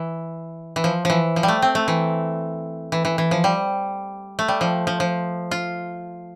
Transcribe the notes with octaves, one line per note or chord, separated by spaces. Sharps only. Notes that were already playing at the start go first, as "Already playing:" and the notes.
Already playing: E3
E3
F3
E3 F3
F3
G3
A3
C4
A3
E3
E3
E3
E3
F3
G3
A3
G3
F3
F3
F3
F4